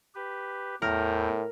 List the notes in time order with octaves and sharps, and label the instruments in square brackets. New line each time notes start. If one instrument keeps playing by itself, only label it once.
[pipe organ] G4 B4
[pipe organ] E2 G5 [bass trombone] A2 [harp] A#4